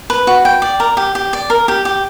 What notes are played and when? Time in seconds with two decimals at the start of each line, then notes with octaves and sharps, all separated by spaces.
0.10 B4
0.27 F#4
0.45 G5
0.62 D5
0.80 A#4
0.97 G4
1.15 G4
1.33 D5
1.50 A#4
1.68 G4
1.85 G4